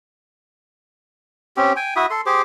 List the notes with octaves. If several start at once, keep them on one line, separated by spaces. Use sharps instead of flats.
C4 C#4 G4
G5 G#5
E4 F#4 E5 D#6
A4 C6
G4 G#4 C5 D6